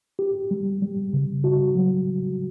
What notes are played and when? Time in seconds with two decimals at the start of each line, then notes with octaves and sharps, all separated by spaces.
0.19 G4
0.51 G3
0.82 G3
1.13 C#3
1.44 F#4
1.75 F#3